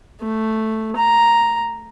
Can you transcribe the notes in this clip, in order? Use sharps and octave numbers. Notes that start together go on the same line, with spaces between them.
A3
A#5